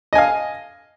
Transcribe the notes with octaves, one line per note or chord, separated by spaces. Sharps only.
D#5 F5 G#5